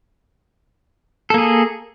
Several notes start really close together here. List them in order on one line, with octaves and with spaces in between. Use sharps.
A4 A#3 G#4